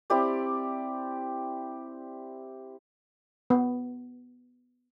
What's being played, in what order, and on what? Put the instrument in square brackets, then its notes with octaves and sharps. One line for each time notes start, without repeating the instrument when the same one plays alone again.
[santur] C4 E4 G4 D5
[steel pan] B3